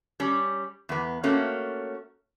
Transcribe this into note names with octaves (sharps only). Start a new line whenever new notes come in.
G3 C#4
E2 B3
A3 A#3 C#4 F#4